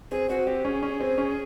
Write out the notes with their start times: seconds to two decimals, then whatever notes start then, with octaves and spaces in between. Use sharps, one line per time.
0.11 C4 G#4
0.29 C4 F#4
0.47 C4 G4
0.65 C#4 G#4
0.83 C#4
1.00 C4
1.18 C#4